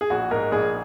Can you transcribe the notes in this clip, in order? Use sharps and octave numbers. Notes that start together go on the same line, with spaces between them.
G#4
A#1 F#4
G#2 A#4
A#1 G#4